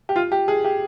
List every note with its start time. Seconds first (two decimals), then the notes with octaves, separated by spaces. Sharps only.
0.09 G4
0.16 F4
0.32 G4
0.48 G#4
0.64 G4